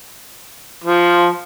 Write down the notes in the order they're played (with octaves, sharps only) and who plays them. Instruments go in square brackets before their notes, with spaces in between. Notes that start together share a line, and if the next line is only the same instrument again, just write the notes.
[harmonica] F3